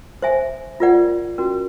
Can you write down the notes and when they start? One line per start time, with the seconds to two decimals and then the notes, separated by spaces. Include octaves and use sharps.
0.22 C5 E5 G#5
0.80 F4 A#4 D5 F#5
1.38 C#4 F#4 A#4